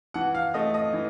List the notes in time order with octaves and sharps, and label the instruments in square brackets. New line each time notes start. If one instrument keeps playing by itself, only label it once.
[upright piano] E3 F#5
F5
A3 D#5
D#5
E3